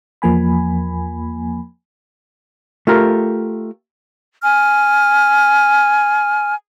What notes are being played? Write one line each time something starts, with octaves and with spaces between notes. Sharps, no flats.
E2 F3 A#3 G#5 B5
A3 F4 G4 A#4
G#5 F6